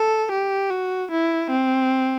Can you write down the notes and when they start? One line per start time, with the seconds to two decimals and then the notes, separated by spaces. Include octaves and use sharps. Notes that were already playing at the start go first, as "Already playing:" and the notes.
Already playing: A4
0.32 G4
0.70 F#4
1.11 E4
1.51 C4